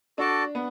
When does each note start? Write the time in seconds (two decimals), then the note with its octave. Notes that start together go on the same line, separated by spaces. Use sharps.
0.18 D4 F#4 A4 D5 A5
0.55 B3